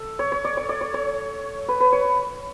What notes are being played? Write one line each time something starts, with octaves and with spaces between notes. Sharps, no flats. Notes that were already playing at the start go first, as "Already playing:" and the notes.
Already playing: A4
C#5
C#5
D5
C#5
D5
C#5
C#5
B4
B4
C#5